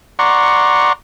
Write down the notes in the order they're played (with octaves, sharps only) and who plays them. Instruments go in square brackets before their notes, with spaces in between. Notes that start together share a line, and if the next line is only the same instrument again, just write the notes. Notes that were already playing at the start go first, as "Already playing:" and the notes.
[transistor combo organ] D5 F#5 A#5 C6 C#6